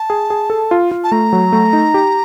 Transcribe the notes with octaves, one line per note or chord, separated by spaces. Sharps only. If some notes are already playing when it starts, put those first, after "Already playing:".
Already playing: A5
G#4
G#4
A4
F4
F4
A5
A3 A#5
F#3
A3
D#4
G4